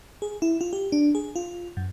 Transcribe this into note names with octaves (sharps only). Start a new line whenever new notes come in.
G#4
E4
F4
G4
D4
G#4
F4
F#2